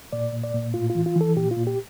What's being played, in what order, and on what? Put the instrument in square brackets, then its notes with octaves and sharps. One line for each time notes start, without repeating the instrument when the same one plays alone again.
[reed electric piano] A#2 D5
A#2
D5
A#2
A2 F4
F4
E3
F4
E3 A4
A#2 G4
F4
A#2
G4